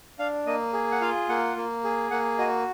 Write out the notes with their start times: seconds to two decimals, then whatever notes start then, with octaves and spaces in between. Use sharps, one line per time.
0.19 D4 F5
0.46 A#3 D#5
0.73 G#4
0.92 F#5
1.01 F4 F5
1.29 A#3 F#5
1.56 A#3
1.84 G#4
2.11 A#3 F#5
2.39 F#4 D#5